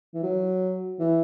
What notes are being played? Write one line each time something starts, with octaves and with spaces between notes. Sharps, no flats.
E3
F#3
E3